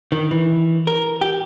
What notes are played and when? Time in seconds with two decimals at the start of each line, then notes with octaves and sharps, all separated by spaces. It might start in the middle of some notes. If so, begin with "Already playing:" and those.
0.12 D#3
0.31 E3
0.87 A#4
1.21 G4